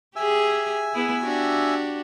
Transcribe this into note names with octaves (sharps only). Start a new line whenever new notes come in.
G4 G#4 E5 G#5 E6
B3 E4 G#4
D4 F#4 G4